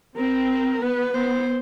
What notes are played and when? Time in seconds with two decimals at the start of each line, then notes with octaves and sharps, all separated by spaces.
0.18 C4 A#4
0.82 B3 B4
1.14 B3 C5